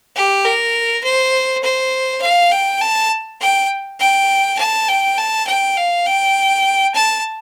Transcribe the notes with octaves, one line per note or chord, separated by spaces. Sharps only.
G4
A#4
C5
C5
F5
G5
A5
G5
G5
A5
G5
A5
G5
F5
G5
A5